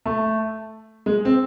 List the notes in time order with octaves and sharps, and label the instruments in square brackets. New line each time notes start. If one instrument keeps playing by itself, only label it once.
[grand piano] A3
G#3
C4